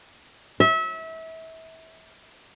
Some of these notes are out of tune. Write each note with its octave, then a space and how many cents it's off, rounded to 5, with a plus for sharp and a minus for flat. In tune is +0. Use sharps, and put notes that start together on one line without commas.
E5 -30